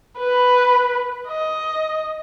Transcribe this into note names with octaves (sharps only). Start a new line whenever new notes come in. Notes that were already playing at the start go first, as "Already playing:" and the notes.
B4
D#5